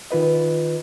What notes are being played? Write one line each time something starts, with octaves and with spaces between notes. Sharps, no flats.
D#3 F4 B4 D#5